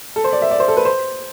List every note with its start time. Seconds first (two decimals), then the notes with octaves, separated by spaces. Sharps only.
0.16 A4
0.24 C5
0.33 D5
0.42 E5
0.51 D5
0.60 C5
0.68 A4
0.77 B4
0.85 C5